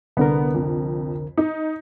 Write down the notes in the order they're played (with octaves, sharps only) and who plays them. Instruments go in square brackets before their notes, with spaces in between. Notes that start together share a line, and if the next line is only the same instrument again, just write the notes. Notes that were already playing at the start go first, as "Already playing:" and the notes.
[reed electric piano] C2 D3 A#4 [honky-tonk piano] B3
[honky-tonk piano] F2
D#4